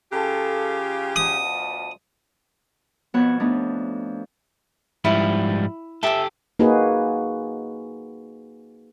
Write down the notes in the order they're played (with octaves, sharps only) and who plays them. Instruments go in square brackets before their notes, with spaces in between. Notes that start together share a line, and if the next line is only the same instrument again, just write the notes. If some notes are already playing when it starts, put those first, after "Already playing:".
[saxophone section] C#3 F4 G4 [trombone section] A4
[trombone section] D2 B2 F3 [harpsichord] D#6
[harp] F2 B2 B3 C#5 F#5
A3 B3 D4 D#4
[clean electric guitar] G#2 F3 G3 [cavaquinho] E4
[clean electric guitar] G4 A4 [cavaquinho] E5 A5 D6
[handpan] A#3 D#4 F#4 G#4 B4